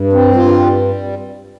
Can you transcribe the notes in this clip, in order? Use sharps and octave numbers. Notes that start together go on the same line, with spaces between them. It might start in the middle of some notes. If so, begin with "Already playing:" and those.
Already playing: G2
C4
G2 F4
G3